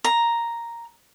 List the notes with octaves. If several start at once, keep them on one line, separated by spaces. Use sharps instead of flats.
A#5